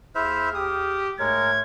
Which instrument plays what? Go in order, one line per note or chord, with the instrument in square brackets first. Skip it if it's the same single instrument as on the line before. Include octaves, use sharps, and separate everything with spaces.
[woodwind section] D#2 G#4 F6 [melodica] E4 C5 E5
[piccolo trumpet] G4 [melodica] D#6
[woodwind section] G#2 A3 C#5 [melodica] G#3 A#4 [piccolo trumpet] G#6